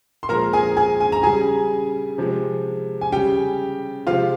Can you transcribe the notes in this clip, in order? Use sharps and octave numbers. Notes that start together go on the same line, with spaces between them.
C6
A#2 F3 G#3 A#4 A#5
G#4 G#5
G#4 G#5
G#5
A#5
C#3 G3 G#4 G#5
C3 F3 G#3
G#5
C#3 G3 G4 G5
C3 F3 G#3 F4 F5